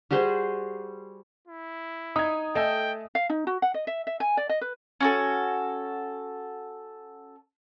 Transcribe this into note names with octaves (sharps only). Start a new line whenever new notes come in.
G3 F#4 G#4 C5
E4
D#4 D#6 G#6
A3 A4 D#5 G5 G#5
F5
D#4
F#4
F#5
D#5
E5
E5
G#5
D5
D#5
B4
C#4 F#4 A4